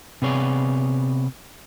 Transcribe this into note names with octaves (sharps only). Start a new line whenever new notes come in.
C3 B3 G#4 C#5 D5